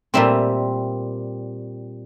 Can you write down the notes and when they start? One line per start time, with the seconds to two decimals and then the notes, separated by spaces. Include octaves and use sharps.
0.14 A#2 G3 C4 E5